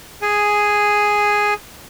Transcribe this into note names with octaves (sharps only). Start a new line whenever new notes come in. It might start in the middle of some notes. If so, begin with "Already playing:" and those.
G#4 G#5